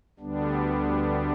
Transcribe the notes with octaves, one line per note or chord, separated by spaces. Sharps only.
D2 D3 G3 B3 D4